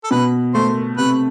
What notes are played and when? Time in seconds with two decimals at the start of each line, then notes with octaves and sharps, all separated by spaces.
0.04 A4
0.11 B2 B4
0.54 A3 C5
0.97 C3 B4